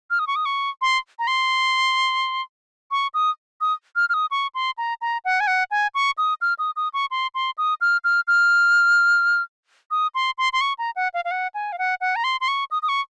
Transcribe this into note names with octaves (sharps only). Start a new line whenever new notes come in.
F6
D#6
C#6
D#6
C#6
C6
A#5
C6
C#6
D#6
D#6
F6
F6
D#6
C#6
C6
A#5
A#5
F#5
G#5
F#5
G#5
C#6
D#6
F6
D#6
D#6
C#6
C6
C6
D#6
F6
F6
F6
D#6
C6
C6
C6
C#6
A#5
F#5
F5
F5
F#5
G#5
F5
F#5
F#5
A#5
C6
C6
C#6
D#6
D#6
C#6